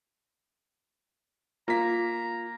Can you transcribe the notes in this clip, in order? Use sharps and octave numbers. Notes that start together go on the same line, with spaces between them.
A#3 F4 A#5 B6